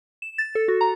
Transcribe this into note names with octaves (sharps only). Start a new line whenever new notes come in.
E7
A6
A4
F#4
A#5